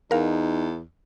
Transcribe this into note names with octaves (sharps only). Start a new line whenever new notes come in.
E2 D#4 A#4 F5